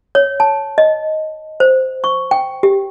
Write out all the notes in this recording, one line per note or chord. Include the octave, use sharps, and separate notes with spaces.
C#5
A5
D#5
C5
C#6
G5
G4